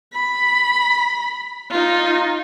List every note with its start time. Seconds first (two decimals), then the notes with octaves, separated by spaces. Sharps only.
0.14 B5
1.70 D#4 F4